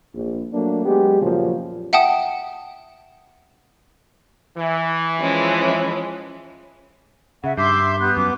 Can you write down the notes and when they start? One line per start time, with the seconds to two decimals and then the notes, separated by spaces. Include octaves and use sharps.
0.14 A#1
0.52 F#3 A3 A#3 D4
0.85 F#3 G#3 B3 G4
1.22 F#2 A#2 C#3 F3 F#3
1.93 E5 F#5 G5 A5 D#6
4.57 E3
5.18 F3 G#3 C#4
7.44 C#3 E5 F#5
7.58 G2 E5 C6 D6 G6
8.00 B3 G4 F#6 G6
8.17 F#2 D6